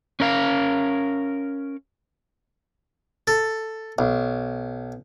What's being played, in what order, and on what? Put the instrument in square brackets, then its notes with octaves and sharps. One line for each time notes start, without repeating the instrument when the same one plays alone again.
[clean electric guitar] C#4 A#4 F5
[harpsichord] A4
B1